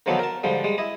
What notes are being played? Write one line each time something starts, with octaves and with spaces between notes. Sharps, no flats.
D3 D#3 F3 F#3 B3 A4
A#4 A5
G#2 D3 F3 G3
G3 G#3
E4 D#5